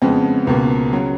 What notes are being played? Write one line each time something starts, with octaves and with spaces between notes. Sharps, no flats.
F2 C#3 G#3 B3
C#2 B2 A#3
C#3 F#3